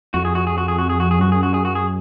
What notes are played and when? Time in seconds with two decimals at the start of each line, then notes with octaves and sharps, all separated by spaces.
0.14 F2 F#4
0.25 G#4
0.35 F#4
0.47 G#4
0.58 F#4
0.68 G#4
0.79 F#4
0.89 G#4
1.00 F#4
1.11 G#4
1.19 F#2 F#4
1.32 G#4
1.43 F#4
1.54 G#4
1.65 F#4
1.75 G#4